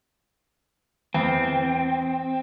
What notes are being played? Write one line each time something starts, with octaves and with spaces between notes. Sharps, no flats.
E2 C4